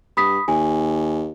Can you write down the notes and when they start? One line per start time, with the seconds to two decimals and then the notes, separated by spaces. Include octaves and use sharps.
0.17 G2 B5 D#6 B6
0.48 D#2 G#5